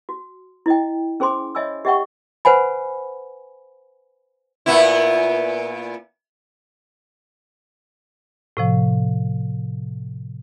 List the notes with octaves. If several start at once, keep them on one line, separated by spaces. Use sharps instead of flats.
F#4
E4 D#5 G5
C#4 G#4 C5 G#5 C6 D6
C#5 D#5 E5 G#5 B5 E6
G4 D#5 E5 F#5 G5 C#6
B4 C5 F#5 G#5 B5
A#2 B3 E4
A2 C3 F3